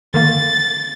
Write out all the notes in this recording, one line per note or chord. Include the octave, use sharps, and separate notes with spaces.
D3 D#3 A#3 A6